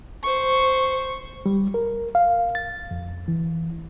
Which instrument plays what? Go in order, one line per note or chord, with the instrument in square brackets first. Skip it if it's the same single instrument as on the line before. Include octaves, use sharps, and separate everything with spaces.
[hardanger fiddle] C5 C#6
[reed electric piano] G3
A#4
F5
A6
F2
E3